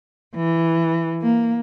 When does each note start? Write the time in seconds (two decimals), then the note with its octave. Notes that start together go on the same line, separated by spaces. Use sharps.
0.36 E3
1.20 A#3